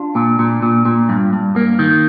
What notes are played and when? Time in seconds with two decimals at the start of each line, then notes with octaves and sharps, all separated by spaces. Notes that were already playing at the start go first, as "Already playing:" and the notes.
Already playing: D4 F4
0.15 A#2
0.39 A#2
0.62 A#2
0.85 A#2
1.09 G2
1.33 G2
1.56 A#3
1.79 D#3